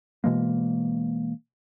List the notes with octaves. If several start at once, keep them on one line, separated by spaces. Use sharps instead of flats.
B2 E3 G#3 A#3